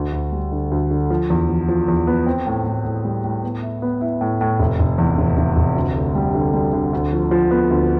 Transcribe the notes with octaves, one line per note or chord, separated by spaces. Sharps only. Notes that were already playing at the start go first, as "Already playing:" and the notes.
Already playing: D2
D2
G3
D3
D2
D3
F3
E2
F3
F3
E2
B3
C4
A2
A2
A2
G3
A2
B3
E4
B3
E4
A2
A2
F1
F1
E2
F1
F1
F1
D2
D3
G3
D3
G3
D3
D2
F3
F3
B3
D2